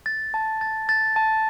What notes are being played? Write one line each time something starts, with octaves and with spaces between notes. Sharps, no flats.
A6
A5
A6
A6
A5